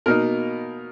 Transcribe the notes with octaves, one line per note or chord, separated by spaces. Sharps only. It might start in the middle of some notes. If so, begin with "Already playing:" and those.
B2 A#3 D#4 A#4